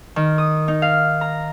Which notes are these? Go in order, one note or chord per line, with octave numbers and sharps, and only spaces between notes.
D#3
D#6
D#4
F5
A#5